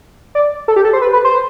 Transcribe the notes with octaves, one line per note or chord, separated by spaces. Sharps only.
D5
A4
G4
A4
C5
B4
B4
C5